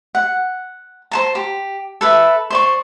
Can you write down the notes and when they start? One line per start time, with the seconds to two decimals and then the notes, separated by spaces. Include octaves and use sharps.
0.15 F#5
1.11 C5 A5 A#5
1.35 G4
2.01 A4 B4 E5
2.50 C5 D5 C#6